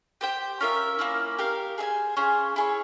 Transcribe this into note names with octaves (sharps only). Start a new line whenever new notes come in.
G4 C5 G5
C#4 F4 A#4 E5
A#3 C#4 E4
G4 A#4 F5
G#4 C5 E5 G#5
C#4 F4 G#4 C5
E4 G#4 C#5